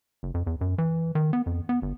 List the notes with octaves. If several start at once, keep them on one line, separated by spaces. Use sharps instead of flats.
F#1
F2
E2
F#2
E3
D#3
B3
F2
B3
G1